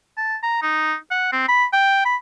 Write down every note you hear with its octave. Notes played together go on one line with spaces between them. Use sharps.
A5
A#5
D#4
F#5
C4
B5
G5
B5